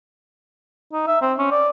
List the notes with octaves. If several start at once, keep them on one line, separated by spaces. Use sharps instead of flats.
D#4
E5
C4
C#4
D5